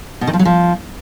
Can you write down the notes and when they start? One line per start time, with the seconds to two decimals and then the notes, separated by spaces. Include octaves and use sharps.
0.21 B2
0.27 D#3
0.33 F3
0.39 F#3
0.45 F3